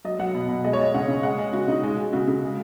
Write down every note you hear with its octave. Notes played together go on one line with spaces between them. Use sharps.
F#3 D#5
F#3 F#5
B2
B2
G#3 D#5
C#5
G#3 D#5
C#3 F#5
C#3
G#3 F#5
G#3
C#3 F#4
C#3 D#4
G#3 F#4
G#3
C#3 F#4
C#3
G#3